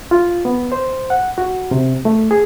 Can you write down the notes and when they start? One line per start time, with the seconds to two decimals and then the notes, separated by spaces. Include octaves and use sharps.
0.11 F4
0.45 B3
0.72 C5
1.10 F#5
1.38 F#4
1.71 C3
2.05 A3
2.31 G#4